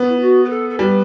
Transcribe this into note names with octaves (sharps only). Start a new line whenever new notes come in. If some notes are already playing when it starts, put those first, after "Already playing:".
Already playing: B3
E4
F#4
B4
A4
A4
G3 B4